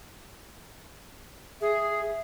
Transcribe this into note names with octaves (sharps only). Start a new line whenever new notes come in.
G#4 E5